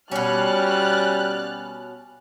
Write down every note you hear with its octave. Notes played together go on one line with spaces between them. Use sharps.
B2 G3 C#4 F6 F#6 A6